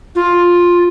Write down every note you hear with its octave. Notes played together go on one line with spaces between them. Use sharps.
F4